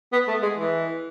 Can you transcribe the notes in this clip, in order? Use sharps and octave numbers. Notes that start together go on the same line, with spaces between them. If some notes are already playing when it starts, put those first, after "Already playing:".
B3
A3
G#3
E3